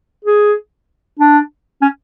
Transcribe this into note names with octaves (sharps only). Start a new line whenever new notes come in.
G#4
D4
C#4